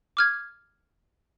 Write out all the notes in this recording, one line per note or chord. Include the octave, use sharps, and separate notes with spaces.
D6 F6 G#6